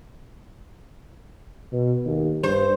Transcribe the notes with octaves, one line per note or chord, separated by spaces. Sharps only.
B2
D#2
G2 C5